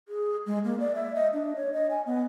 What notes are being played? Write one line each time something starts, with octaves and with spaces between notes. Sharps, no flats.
G#4
G#3
A#3
D5
E5
D#5
D4
C#5
D#5
G#5
B3